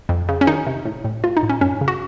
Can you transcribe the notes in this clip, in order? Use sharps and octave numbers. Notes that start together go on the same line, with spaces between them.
F2
C#3
C#4
D#3 D#4
C3
A2
A2
A2 F4
D#4
A2
C#4
F#2 C#4
C#3
F#4